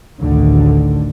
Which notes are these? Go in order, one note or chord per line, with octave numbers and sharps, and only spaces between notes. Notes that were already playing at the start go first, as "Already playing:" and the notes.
A1 D2 D3 D#3